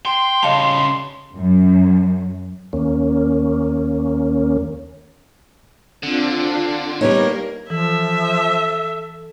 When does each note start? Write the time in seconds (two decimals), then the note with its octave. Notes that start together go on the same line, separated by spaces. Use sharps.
0.05 G5 C6
0.43 C#3 G3 D#5 F5 A5
1.36 F#2
2.73 D#2 A#3 C#4
6.03 D3 C4 D4 F4
7.01 G3 A#3 B3 D#4 A#4 C#5
7.70 E3 F3 A4 E5